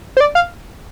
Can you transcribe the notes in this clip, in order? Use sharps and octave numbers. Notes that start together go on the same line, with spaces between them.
C5
D5
F5